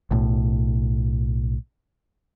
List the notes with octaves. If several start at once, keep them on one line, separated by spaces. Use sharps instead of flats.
B1 A2